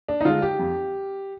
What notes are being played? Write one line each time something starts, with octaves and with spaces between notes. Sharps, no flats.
D4
D#4
D3 G#3 F4
G4
F2